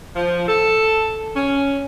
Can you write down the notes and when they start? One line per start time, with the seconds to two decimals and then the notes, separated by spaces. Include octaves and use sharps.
0.16 F3
0.48 A4
1.36 C#4